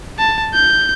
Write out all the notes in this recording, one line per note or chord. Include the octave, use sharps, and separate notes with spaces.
A5
G6